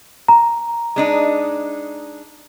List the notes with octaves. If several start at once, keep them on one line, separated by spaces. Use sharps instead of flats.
A#5
G#3 D4 D#4